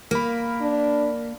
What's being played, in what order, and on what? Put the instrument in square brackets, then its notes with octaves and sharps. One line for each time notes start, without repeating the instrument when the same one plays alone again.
[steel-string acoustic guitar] A#3 [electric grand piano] A#4 B5
[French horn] D4